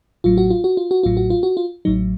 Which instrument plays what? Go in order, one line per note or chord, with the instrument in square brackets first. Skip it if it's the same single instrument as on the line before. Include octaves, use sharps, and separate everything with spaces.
[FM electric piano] A1 A2 F#3 F4
F#4
F4
F#4
F4
F#4
A1 A2 F#3 F4
F#4
F4
F#4
F4
A1 A2 F#3 D#4